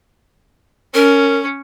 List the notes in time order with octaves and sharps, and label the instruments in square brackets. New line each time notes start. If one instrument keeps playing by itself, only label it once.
[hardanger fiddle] C#4 [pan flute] A#4